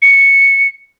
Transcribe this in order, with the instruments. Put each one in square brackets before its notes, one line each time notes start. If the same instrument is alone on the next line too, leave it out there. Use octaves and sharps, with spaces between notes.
[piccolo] C#7